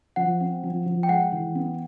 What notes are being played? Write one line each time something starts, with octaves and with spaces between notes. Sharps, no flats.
F3 F#5
C4
F3
F3
G5
G#3 F#5
E3
B3